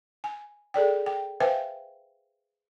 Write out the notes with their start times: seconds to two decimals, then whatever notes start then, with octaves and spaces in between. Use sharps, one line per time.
0.24 G#5
0.74 G#4 A4 D5 G5
1.06 G5
1.40 B4 C5 E5 F5 G5 G#5